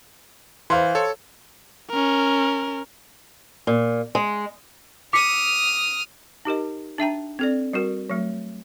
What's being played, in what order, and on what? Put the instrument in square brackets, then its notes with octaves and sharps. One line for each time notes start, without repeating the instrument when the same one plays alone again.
[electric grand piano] E3 [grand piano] C5 F5 C6
[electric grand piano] A4 C#5
[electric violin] C#4 A#4
[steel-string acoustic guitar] A#2
G#3
[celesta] D6 B6 C#7 [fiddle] D#6 F6
[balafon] D#4 G4 A#4 D#5
D4 E5 G5 A#5
C4 A4 D5
G3 F#4 A#4
F#3 A3